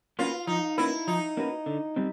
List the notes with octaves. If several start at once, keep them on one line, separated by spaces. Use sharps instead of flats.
A#3 C#4 F4 F#4 B4
F3 D#4
A#3 C#4 E4 F#4 B4
F3 D#4
A#3 C#4 F#4 B4
D3
G3 C4